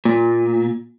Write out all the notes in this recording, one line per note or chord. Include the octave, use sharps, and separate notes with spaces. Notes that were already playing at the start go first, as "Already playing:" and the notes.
A#2